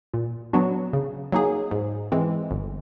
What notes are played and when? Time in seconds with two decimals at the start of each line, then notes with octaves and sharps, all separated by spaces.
0.14 A#2
0.53 F#3 B3 D4 F#4
0.93 C#3
1.32 F#3 A#3 D#4 G#4
1.71 G#2
2.12 E3 G#3 C4
2.51 G1